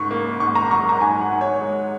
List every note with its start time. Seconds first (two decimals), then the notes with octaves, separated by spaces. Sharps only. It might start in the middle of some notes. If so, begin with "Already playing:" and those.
Already playing: G#2 C#3 C#6
0.11 A#3
0.40 G#2 C#6
0.55 A#5
0.71 F#3 C#6
0.89 A#5
1.01 G#2 G#5
1.21 F#5
1.31 G#2
1.41 C#5
1.61 G#3